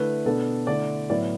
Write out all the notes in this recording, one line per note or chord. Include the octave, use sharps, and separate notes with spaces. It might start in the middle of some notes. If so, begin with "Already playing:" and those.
Already playing: D3 A3 E4 B4
B2 B3 D4 A4
D3 A3 E4 D5
A2 F#3 B3 E4 D5